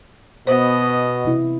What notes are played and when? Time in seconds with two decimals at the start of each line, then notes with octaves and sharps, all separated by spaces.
0.47 B2 B3 C5 D#5
1.25 C3 E4